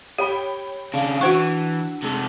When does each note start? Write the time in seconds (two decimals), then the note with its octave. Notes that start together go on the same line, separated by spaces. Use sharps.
0.18 G4 C#5 G5 B5
0.94 C#3 D4 F5
1.21 E3 D4 F#4 C5 F#5 C#6
2.03 C3 G#3 A4